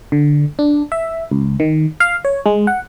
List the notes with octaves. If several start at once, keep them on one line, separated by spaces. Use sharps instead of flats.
D3
D4
E5
C#2
D#3
F5
C#5
G#3
F#5